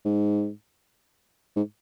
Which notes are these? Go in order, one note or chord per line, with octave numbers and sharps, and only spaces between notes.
G#2
G#2